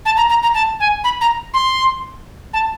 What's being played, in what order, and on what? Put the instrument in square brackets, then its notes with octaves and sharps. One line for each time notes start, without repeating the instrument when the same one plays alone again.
[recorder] A5
A#5
A#5
A#5
A5
G#5
B5
A#5
C6
A5